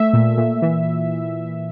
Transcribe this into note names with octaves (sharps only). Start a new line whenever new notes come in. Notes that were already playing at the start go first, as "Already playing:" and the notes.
Already playing: A3 E5
A#2
A#2
E3